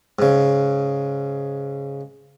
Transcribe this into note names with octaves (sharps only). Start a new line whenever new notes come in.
G#2 C#3